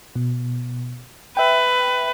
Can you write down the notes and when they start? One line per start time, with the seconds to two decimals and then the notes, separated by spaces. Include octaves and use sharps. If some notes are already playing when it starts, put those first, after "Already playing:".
0.15 B2
1.37 B4 E5 G5